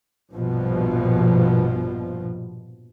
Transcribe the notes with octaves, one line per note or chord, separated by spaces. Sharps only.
A#1 G2 B2 F3